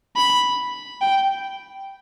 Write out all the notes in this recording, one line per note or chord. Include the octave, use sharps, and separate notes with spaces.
B5
G5